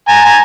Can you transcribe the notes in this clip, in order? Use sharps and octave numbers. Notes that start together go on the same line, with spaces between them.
G#5 A#5
G#5 A#5